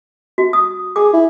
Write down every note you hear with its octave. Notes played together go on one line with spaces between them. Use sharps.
F#4
D#6
G#4 D6
E4